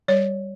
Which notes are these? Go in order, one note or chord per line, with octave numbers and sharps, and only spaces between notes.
G3 C#5